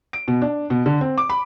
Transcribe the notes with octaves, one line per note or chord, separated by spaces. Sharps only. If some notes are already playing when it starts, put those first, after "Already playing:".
D7
B2
D4
B2
D3
C4
D6
B5